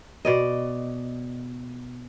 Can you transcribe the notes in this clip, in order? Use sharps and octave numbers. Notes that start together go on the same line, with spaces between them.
B2 D5 D#5